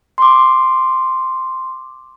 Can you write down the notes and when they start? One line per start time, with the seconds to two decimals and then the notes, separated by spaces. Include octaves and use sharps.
0.18 C6 D6